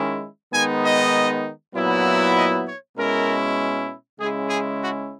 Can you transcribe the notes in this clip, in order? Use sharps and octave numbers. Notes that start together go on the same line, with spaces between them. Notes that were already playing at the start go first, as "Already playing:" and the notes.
Already playing: D#3 G#3 C#4 E4
D#3 G#3 B3 D#4 G#5
D#5
A#2 F#3 B3 E4
D#5
C#5
B2 G#3 C#4 E4 A#4
C#3 G#3 C#4 E4 G#4
G#4
F#4